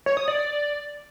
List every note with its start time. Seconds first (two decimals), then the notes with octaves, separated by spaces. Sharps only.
0.06 C#5
0.17 D#6
0.28 D5
0.39 D5